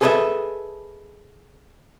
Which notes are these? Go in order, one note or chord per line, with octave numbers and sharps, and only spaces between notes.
G#4 A4 B4 C5 D#5 E5